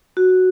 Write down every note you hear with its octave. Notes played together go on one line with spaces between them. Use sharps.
F#4